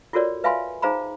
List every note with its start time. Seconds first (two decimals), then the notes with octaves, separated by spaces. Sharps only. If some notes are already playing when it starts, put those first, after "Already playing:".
0.13 F4 F#4 A4 A#4 C#5 D5
0.44 B4 E5 F5 G#5 B5 C6
0.82 D#4 G#4 C5 F5 A#5 B5